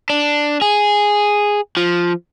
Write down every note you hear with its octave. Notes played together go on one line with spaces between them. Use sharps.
D4
G#4
F3